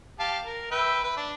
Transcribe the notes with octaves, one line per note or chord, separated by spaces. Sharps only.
G4 F5 A5
A#4
B4 E5 G5
B4
D4